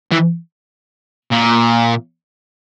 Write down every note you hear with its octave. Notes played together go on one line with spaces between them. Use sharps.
E3
A#2